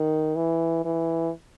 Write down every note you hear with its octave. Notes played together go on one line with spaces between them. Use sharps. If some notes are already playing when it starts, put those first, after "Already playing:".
Already playing: D#3
E3
E3